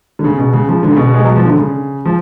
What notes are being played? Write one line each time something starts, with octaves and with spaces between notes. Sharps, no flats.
D3
C#3
B2
C#3
F3
D3
C#3
B2
G#3
F#3
F3
D3
C#3
F3